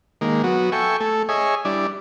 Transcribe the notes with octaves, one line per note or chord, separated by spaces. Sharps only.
D#3 G#3 A#3
F#3 B3 F#4
A4 E5 G5 G#5 C#6
A3 A4
G#4 C#5 D#5 E5 G#5
G3 D4 E4 D5